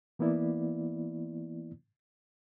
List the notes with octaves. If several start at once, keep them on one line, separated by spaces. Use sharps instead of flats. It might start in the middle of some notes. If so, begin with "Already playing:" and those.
E3 A#3 B3 E4 D5